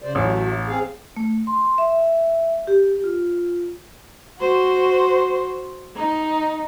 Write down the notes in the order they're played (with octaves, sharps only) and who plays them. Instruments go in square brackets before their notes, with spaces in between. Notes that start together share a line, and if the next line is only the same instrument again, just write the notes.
[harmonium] C#3 C5 D5
[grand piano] A1 [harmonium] F#3 A3
[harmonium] C4 G#4 F5
[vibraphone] A3
C6
E5
G4
F4
[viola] F#4 C5
D#4